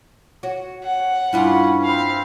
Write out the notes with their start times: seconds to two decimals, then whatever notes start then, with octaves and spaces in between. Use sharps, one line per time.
0.43 F#4 C#5
0.84 F#5
1.33 G2 C#4 D4 E4 F4 G#5 B5
1.84 C4 F5 B5